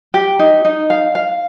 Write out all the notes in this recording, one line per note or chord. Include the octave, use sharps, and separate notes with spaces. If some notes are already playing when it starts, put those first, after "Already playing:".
G4
D#4
D#4
F5
F5